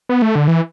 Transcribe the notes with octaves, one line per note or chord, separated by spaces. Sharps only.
B3
A3
D3
E3